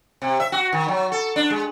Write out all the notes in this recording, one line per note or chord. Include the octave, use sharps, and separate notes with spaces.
C3
E5
F#4
D#3
F#3
A4
D4
G#3